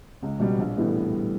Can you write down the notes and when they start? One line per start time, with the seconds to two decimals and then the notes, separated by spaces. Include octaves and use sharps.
0.22 C#2
0.40 B2 G3
0.58 A#1
0.77 A2 E3 G3 B3